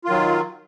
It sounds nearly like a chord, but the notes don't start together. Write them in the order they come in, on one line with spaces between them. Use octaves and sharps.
F4 D#3 F#3